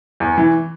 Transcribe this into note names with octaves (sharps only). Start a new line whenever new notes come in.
E2
E3